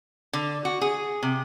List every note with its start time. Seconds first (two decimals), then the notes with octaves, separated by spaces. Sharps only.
0.33 D3
0.65 F#4
0.81 G#4
1.23 C3